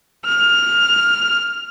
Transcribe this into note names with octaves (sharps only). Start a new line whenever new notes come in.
F6